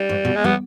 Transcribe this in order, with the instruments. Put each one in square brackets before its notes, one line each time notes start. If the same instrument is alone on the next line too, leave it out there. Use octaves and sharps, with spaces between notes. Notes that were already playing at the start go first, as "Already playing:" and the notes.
Already playing: [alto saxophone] G3
[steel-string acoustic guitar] G#2
B2
[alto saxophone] G#3
[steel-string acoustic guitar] G3 [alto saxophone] B3